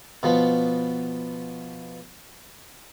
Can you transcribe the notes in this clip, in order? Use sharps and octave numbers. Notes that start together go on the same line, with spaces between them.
B2 F3 B3